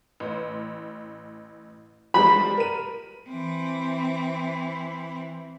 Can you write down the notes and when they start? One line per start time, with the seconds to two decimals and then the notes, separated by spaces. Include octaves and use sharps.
0.20 A1
2.14 F3 G3 G#3 B5
2.58 A#4 D#7
3.28 E3 C4